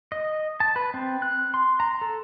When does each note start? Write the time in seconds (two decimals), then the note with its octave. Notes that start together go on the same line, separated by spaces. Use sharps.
0.12 D#5
0.60 A5
0.76 B4
0.94 C4
1.22 F#6
1.54 C6
1.80 A#5
2.01 A4